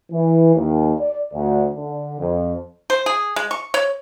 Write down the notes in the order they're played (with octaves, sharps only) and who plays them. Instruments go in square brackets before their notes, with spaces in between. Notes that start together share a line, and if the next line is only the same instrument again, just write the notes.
[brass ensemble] E3
D#2
D5
D2
D3
F2
[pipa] C5
G#4
G#3
C#6
C#5